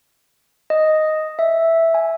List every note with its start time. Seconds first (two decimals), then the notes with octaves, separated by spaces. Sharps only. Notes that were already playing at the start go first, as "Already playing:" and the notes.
0.70 D#5
1.39 E5
1.94 G#5